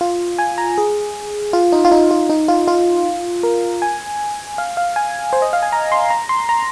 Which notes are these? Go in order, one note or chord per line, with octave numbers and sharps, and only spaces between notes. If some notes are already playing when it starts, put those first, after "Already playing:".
F4
G#5
A#5
G#4
F4
D#4
F4
D#4
F4
D#4
F4
F4
A#4
G#5
F5
F5
G#5
C5
D#5
F5
G#5
A#5
C6
A#5
C6
A#5